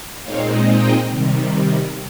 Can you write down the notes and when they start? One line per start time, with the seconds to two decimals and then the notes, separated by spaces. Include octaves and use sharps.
0.24 A#2 G#3 C4 D#4 C#5 F5
0.66 D#5 G5
1.09 C3 D#3 G3